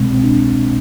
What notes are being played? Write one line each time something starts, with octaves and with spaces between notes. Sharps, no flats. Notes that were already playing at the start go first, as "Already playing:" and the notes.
Already playing: C2 B2 G#3 C4
C4
D4